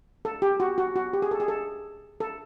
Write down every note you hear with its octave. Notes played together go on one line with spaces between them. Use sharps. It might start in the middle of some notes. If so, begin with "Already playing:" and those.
A4
G4
F#4
F#4
F#4
G4
G#4
A4
G#4
A4
A4